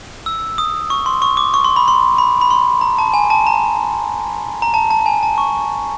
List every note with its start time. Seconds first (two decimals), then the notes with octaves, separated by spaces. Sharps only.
0.26 E6
0.58 D#6
0.90 C#6
1.06 C6
1.22 C#6
1.37 D6
1.54 C#6
1.64 C6
1.76 B5
1.88 C6
2.18 B5
2.41 B5
2.50 C6
2.81 A#5
2.99 A5
3.14 G#5
3.30 A5
3.47 A#5
4.62 A#5
4.74 A5
4.91 A5
5.06 G#5
5.23 A5
5.38 C#6